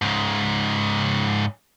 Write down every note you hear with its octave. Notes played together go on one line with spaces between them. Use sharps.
G#2 C#3